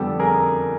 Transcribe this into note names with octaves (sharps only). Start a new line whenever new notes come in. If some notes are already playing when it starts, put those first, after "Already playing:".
Already playing: F2 D3 G3 B3 G4 A4
G#4 A#4